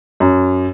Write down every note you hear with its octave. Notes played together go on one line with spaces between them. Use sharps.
F#2